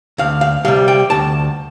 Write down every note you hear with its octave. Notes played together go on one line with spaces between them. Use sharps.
D2 F5
F5
C3 G3 F5
G5
D2 A5